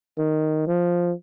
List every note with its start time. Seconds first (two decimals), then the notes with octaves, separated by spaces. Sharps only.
0.18 D#3
0.67 F3